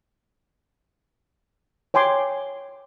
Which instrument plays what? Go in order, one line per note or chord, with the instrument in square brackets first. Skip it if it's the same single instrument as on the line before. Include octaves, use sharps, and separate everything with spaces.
[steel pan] C#5 G5 G#5 C6 D6